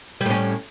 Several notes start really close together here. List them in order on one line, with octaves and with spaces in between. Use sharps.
G3 A2 C#4